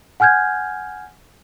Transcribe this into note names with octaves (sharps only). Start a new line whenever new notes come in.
F#5 G#5 F6 G6 G#6